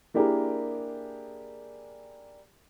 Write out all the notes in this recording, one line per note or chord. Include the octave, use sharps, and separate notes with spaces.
A#3 D4 E4 G4 G#4 A#4